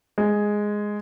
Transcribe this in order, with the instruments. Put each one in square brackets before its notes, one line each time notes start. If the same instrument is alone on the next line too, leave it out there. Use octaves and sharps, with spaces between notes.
[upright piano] G#3